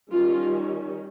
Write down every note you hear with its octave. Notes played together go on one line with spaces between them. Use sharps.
D#3 G3 C#4 F4